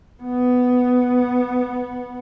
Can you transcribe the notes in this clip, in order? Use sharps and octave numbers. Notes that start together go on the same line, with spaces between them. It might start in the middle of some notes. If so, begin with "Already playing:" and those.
B3